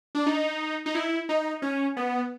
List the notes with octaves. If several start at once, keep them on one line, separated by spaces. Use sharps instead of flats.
D4
D#4
D#4
E4
D#4
C#4
B3